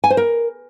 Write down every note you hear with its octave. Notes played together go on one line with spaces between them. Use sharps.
G#5
C5
A#4